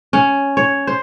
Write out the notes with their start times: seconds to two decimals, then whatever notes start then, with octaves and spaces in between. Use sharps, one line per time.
0.13 C#4
0.57 C#5
0.87 C5